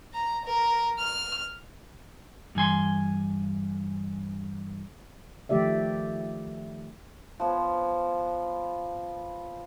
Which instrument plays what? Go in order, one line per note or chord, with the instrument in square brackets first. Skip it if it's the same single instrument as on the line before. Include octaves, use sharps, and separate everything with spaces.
[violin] A#5
A#4
F6
[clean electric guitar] G2 E3 G#5 C6
[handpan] D#3 F3 A3 G4 D5 E5
[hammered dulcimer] F3 B3 C#5